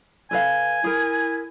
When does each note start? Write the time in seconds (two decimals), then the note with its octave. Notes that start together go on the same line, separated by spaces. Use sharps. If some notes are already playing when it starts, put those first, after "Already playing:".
0.31 A4 B4 F5 G#5
0.84 E4 G#4 A#4